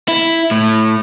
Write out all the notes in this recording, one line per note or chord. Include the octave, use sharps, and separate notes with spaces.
E4
A2